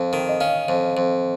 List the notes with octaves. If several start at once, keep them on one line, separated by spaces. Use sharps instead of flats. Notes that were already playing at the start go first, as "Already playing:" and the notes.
Already playing: F2 F5
D#3
D#5
C#4 F5
F2
F2